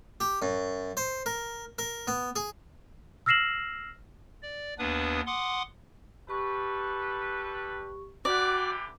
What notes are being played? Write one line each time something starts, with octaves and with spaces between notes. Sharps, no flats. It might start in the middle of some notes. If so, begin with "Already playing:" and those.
G4
F#2
C5
A#4
A#4
B3
G#4
E6 F6 A#6 C7 E7 F#7
D5
D#2 B3 D4 B4 D#6
F#5 C6 D6 D#6
G3 G4 A4 B4 C#6
D3 E3 F#4 G4 D5